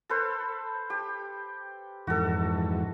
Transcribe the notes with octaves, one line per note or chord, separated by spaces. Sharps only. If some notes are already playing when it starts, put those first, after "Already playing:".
A4 B4 C5
G4
F2 G#2 E3 F#4 A4